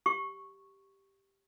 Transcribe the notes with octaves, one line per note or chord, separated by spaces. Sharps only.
G4 C#6